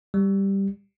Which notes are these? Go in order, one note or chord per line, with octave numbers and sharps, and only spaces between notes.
G3